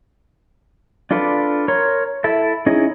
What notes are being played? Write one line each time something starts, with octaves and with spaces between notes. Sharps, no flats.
D4 F4 A4 B4 D5
A#4 C#5 A#5 C6
E4 A4 E5
C#4 D#4 E4 G#4 D#5